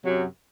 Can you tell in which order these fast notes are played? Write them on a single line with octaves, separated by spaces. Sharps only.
C3 F#3 F#2